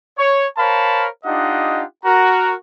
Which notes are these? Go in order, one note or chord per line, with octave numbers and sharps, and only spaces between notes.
C#5
A#4 C5 C#5 F5 A5 B5
D4 D#4 F4 G4 D#5 F#5
F#4 A#4 A#5